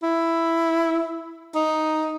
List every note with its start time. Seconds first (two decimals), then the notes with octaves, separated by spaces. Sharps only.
0.03 E4
1.55 D#4